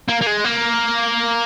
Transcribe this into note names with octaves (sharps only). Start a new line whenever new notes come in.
A#3
A#3
G#3
A#3